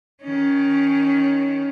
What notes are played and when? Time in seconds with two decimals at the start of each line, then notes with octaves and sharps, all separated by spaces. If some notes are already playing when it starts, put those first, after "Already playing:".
0.23 D#3 C#4